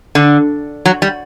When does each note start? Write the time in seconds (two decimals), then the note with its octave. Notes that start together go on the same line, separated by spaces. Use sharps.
0.15 D3
0.86 F#3
1.02 G3